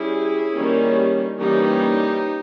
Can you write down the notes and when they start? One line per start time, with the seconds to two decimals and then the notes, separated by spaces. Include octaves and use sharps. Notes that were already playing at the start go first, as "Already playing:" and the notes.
Already playing: G3 C#4 E4 G#4
0.53 D#3 G3 A#3 C#4
1.39 E3 G3 A#3 C#4 D#4 G4